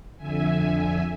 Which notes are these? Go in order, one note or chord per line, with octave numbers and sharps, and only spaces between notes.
F2 D3 E5 G#5